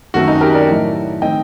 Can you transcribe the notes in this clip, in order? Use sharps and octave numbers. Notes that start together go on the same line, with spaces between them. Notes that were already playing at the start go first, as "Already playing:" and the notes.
F#2 D#3 A3 C4 F#4
D#4
G4 A#4
A#4 D5
A2 F#3 A3
D#3 A3 C4 D#5 G5